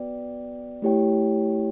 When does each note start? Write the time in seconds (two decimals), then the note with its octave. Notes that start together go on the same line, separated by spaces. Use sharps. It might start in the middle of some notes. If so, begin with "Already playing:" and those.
Already playing: B3 F#4 B4 D5 G5
0.82 A3 E4 G4 C#5 G5